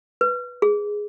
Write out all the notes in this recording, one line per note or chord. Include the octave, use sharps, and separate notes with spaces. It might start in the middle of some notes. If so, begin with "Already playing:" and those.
B4
G#4